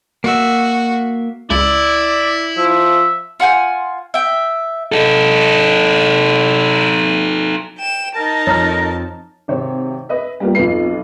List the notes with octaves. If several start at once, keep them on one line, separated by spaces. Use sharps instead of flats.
A#3 F#4 E5
C#2 E4 D5
F3 E5
F4 F#5 G#5 G6
E5 G5
D#4 A4
G5 E7
D#4 A#4 A5
F2 F3 C#5 A#5 F6
G#1 C3 C5 C#5
B4 D#5 E5
G3 A#3 B3 F4 G4
B1 F2 F4 B4 C7